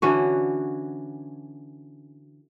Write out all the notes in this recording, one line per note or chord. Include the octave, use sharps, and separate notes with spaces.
D3 E3 C#4 F#4